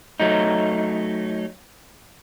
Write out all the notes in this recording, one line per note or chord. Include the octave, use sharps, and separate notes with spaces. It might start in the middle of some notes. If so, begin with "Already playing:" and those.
F#3 A3 D#4